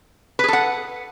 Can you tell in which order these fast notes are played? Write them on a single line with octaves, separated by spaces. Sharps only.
B4 G#4 A4 F#5